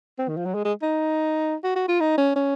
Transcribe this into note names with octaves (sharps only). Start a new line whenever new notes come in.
C4
D#3
F3
F#3
G#3
G#3
D#4
F#4
F#4
F4
D#4
C#4
C#4